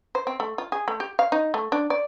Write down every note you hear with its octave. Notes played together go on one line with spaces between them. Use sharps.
C5
C4
A3
F4
G#4
A3
G4
F5
D#4
A3
D4
D5